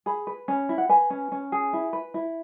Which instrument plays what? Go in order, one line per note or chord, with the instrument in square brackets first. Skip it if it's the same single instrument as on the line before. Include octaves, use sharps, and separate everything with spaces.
[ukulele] G#4 B5
B4
C#4
E4
F#5
B4 G#5
C#4
C#4
G#4
E4
B4
E4